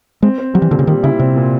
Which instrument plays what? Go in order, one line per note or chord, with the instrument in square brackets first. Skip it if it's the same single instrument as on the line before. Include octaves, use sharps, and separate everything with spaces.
[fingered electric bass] G#3 [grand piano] C4
[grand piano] C4
[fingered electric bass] F#3 [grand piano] G3
[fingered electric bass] E3
[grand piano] A#2 [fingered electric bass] D3
[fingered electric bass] C#3
[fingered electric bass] D#3 [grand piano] G3
[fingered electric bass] C#3 [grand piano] E4
[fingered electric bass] C3 [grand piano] C4
[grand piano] A#2